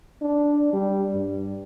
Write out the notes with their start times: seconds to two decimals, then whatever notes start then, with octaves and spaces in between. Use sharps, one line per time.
0.22 D4
0.73 G3
1.14 G2